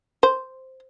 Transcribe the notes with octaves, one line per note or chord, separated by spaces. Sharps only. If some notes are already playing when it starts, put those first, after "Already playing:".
C5